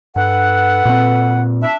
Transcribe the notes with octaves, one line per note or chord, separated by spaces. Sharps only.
G2 A4 B4 F#5
A#2 C4
D4 E5